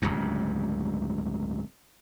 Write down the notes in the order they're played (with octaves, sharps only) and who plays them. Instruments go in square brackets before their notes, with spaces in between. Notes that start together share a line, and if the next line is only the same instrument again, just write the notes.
[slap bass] D1 G1 C#2 G2